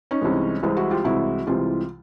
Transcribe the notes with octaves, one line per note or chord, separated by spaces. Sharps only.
C#4 D#4
C2 C3 E3 G#3
C2 C3 E3 G#3
E4 F#4
F4 G4
C2 C3 E3 G#3 E4 F#4
C2 C3 E3 G#3 F4 G4